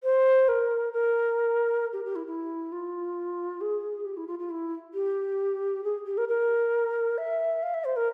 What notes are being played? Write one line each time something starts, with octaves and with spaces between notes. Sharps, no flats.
C5
A#4
A#4
G4
G4
E4
E4
F4
G#4
G4
E4
F4
F4
E4
G4
G#4
G4
A#4
A#4
E5
F5
E5
C5
A#4